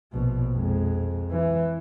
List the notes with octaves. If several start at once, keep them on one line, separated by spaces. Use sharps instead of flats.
A#1 B2
F2 G#3
E3